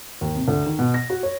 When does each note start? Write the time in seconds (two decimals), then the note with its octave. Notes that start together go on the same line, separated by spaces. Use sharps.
0.21 D#2
0.36 C3
0.48 D2
0.66 D#3
0.79 B2
0.94 A#6
1.10 F#4
1.23 C#5